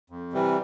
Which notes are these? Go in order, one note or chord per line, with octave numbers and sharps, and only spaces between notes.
F2
C3 E3 G3